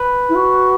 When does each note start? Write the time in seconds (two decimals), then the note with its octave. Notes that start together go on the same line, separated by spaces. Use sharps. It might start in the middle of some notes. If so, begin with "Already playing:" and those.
Already playing: B4
0.29 E4
0.35 F#4